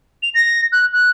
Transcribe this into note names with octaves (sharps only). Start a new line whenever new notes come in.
F7
A#6
F#6
F#6